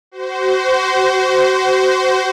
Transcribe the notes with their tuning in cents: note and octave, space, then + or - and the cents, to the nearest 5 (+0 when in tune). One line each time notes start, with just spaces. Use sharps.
F#4 +30 C5 -15